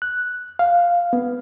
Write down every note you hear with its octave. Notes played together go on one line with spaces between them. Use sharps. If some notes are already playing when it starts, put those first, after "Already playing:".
F#6
F5
B3